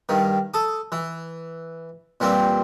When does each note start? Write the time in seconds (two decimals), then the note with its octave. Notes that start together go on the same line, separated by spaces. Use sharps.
0.09 G2 D#3
0.54 A4 D#6
0.92 E3
2.20 A#2 E3 G3 C4